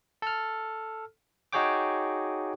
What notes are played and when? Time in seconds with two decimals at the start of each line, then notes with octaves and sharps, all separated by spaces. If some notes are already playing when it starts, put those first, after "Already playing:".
0.22 A4 F6
1.53 D#4 F#4 G#4 C#5 G5 D6